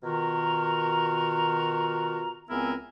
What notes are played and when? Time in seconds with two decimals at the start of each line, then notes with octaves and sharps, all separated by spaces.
0.03 B2 D#3 F4 F#4 A#4 A#5
2.50 C#2 B3 C4 E4 A#4 G#5